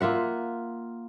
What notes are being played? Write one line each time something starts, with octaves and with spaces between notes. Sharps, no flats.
A#3 F4 E5 F#5